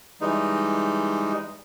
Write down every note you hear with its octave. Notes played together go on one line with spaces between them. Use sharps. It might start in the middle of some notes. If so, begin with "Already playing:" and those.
E3 G3 G#3 D#4